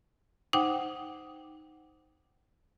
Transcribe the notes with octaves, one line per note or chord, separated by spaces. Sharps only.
D#4 C5 F#5 G5 D6